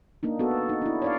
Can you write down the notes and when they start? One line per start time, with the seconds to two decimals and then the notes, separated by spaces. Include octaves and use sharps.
0.23 A#3 D4 D#4
0.39 B3 F#4 A4
0.69 D#4
0.82 D4 E4
1.02 C#5 D5 F5